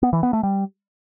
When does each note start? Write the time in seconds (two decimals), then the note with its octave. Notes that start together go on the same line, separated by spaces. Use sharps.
0.03 B3
0.13 E3
0.23 B3
0.33 A3
0.43 G3